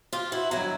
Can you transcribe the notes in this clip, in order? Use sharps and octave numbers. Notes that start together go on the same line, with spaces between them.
F4 G4
E4 F#4
G2 D#3 F#3 E4 F#4